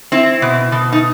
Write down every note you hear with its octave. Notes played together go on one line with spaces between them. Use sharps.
C4 E4
B2
B2
D#4